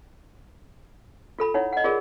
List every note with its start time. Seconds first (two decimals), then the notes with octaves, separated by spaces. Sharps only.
1.39 F4 A4 B5
1.54 D#4 E4 C#5 F#5
1.73 D#5 F#5
1.84 F4 G#4 A#4 D5